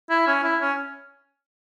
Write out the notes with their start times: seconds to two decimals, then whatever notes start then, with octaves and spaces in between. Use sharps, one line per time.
0.10 E4
0.27 C#4
0.43 E4
0.61 C#4